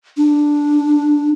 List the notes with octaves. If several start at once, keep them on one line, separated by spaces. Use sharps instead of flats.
D4